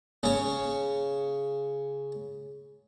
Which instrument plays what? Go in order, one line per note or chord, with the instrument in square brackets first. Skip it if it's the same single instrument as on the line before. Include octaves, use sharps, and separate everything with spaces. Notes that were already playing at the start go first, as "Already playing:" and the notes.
[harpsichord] C#3 C#5